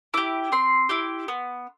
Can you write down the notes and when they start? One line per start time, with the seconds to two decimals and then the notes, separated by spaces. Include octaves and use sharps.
0.14 E4 G4 D6
0.52 C4 C6
0.89 E4 G4
1.28 B3